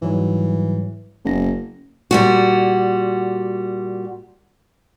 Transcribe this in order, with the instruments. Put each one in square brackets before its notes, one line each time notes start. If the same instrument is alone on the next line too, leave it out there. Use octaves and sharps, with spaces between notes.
[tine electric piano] G#2 F#3 G3 [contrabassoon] E3
[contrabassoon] F#1 [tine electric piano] B3 A#6
[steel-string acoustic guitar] A#2 G3 F#4